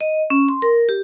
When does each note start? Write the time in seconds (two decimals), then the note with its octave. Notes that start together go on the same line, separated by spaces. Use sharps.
0.01 D#5
0.30 C#4
0.49 C6
0.62 A#4
0.89 G4